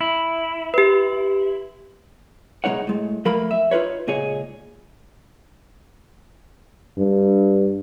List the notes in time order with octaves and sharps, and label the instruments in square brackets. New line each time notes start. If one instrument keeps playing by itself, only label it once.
[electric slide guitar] E4
[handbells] G4 B4
[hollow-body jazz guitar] B2 G#3 D#4 C#5 F#5
A2 G#3
F3 A3 A#3 A#4 B5
E5
D#4 F4 A#4 B4 C#5
C#2 A#2 D#4 G#4 C#5
[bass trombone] G2